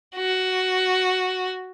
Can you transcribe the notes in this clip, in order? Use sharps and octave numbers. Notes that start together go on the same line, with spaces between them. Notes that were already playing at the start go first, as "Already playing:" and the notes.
F#4